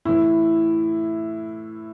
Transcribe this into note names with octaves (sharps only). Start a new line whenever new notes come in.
A2 E3 E4